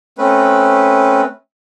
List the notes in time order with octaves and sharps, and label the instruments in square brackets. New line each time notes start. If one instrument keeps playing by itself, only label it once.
[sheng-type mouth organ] A3 C4 C#4 B4